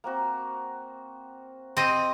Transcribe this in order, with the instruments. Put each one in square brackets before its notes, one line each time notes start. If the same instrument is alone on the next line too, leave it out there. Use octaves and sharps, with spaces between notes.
[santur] A#3 C4 F#4
[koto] C4 D#5 [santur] G4